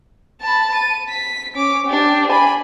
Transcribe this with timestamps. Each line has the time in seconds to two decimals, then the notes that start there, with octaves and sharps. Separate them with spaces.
0.42 A5 B5
0.75 D#7
1.09 B6
1.56 C#4 D6
1.86 D4 G4
2.28 G#5 B5